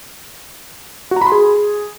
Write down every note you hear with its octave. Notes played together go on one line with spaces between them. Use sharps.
F#4
A#5
B5
C6
G#4